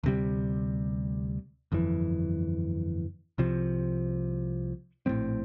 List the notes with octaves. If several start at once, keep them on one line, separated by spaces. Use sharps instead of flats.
D2 C3 G3
G1 F2 E3
C2 C3 F3
A#1 A2 G3 C4